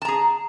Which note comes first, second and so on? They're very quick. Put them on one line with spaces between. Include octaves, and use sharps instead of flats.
A5 A#5 G#4